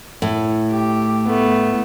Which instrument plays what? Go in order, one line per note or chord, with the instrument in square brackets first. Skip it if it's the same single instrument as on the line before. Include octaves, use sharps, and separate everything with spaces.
[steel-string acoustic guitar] A2
[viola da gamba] G4
A3 B3